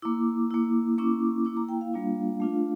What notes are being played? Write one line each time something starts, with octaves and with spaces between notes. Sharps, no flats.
A#3 E4 D6
A#3 E4
A#3 C#4 E4 D6
A#3 E4 D6
A#5
G5
F5
G3 A#3 D4 F4
A3 D4 F4